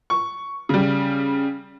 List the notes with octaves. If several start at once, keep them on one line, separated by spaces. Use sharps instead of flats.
C#6
C#3 G3